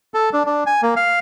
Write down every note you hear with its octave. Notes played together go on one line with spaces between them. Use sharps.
A4
D4
D4
G#5
A#3
F5